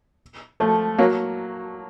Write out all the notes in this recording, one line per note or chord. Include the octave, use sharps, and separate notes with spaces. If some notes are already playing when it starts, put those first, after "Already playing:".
F3 A3
F#3 A#3